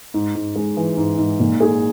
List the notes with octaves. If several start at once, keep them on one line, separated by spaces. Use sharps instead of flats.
G#2
G#2
G#3
E3
G#2
G#2
A#2
G#4